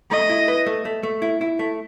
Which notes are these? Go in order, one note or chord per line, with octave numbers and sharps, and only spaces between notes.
A3 D#5
E4
B4
A3
A3
A3
E4
E4
A3